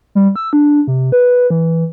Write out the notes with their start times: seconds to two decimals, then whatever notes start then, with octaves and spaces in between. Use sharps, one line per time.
0.15 G3
0.36 E6
0.53 D4
0.87 C3
1.12 B4
1.50 E3